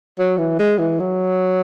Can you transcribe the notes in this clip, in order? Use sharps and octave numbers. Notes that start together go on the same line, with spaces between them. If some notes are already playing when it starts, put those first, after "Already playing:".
F#3
E3
G#3
E3
F#3